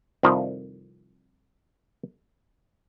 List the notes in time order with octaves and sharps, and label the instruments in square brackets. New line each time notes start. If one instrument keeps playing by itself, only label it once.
[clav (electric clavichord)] C2 F2 D#3 F3